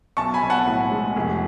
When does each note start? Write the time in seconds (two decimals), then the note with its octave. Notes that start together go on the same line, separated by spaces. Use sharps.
0.17 B1 A5 C#6
0.34 G#5 B5
0.43 B1
0.50 F#5 A5
0.67 A2
0.91 G#3
1.17 F1